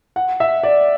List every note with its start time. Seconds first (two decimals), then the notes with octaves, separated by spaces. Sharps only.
0.16 F#5
0.40 E5
0.63 D5